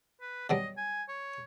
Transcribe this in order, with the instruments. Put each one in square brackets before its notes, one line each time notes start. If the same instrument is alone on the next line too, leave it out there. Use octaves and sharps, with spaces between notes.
[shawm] B4
[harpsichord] B2 F#3 G3 [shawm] D#5
[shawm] G#5
C#5